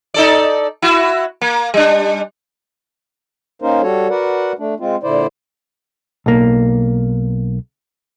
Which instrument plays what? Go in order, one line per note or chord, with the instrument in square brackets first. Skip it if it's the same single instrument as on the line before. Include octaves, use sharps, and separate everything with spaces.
[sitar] D#4 A4 D5
E4 F#4
A#3
G3 D4
[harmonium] A#3 C#4 D#4 A#4 C5
G3 F#4 A4 C#5
F#4 A#4 B4 D5 F#5
A3 D4
G#3 C4 F4
A#2 D3 E4 C5 D5
[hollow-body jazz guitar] B1 A#3